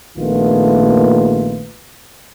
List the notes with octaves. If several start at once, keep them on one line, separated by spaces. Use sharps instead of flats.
A#1 A#2 D#3 A3 B3 F4